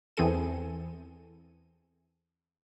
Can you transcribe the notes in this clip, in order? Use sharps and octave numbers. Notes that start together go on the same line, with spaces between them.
E2 E3 C4 G#4 A4 D#7